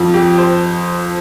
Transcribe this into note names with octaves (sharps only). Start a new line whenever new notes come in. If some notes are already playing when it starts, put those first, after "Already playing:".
Already playing: F2 F3
G4
C5